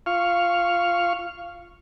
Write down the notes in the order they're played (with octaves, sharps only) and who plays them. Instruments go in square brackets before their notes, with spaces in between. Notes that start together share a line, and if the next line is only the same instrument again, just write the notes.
[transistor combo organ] F4 F5 C#6 F6